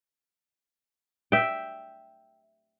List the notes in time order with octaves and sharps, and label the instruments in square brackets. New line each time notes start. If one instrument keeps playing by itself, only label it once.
[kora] E5 G5